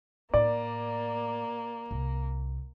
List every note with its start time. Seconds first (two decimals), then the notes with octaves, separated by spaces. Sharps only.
0.34 A2 A#3 D5
1.91 C2